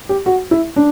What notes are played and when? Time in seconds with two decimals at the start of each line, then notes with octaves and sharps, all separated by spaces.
0.09 G4
0.26 F#4
0.51 E4
0.76 D4